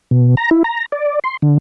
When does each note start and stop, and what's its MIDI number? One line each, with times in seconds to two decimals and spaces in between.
0.11 0.35 47
0.37 0.50 82
0.51 0.63 64
0.64 0.86 82
0.92 1.19 74
1.24 1.37 84
1.42 1.58 50